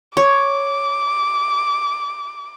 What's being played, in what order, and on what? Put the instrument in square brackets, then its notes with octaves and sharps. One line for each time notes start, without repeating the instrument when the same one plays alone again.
[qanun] C#5 [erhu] D6